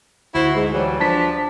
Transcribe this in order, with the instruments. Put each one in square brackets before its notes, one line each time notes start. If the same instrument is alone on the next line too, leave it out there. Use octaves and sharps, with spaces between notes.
[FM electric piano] D2 [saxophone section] E4 F#4 C5
[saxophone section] G#2
E3 F#3 G3
[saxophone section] F3 D4 [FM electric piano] A5 B6